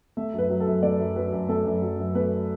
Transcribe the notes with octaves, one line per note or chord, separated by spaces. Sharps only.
A3 E5
F#2
B4
F#3
A4
F#2
A3 D5
F#2
F#3 B4
F#2
A3 A4
F#2
F#3
F#2
A3 B4